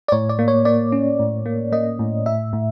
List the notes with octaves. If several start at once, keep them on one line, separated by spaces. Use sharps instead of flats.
D5
A2 C#5
D5
A#3
C#5
A#3 D5
C#4
A2
A#3
A#3 D#5
A2
A2 E5
A2